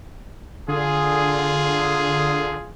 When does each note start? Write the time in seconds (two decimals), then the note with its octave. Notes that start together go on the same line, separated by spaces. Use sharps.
0.68 D3 F4 G#4